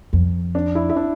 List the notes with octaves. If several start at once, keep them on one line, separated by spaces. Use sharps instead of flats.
F2
D4
E4
E4
D4